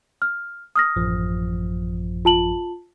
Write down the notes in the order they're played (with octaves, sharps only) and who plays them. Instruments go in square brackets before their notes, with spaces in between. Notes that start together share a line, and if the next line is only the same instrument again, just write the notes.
[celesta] F6
D#6 F6 A#6
[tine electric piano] A1 F#2 F3
[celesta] F4 A5 F#7